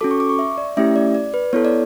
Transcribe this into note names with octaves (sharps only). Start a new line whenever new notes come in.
C#4 F#4 A4 D6
C#6
D6
C#6
E5
D5
A3 C#4 E4 G4 E5
D5
D5
B4
B3 E4 A4 C#5
D5